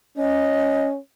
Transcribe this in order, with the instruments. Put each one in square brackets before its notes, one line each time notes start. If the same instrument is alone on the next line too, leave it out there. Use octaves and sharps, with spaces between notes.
[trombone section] C#4 [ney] D#5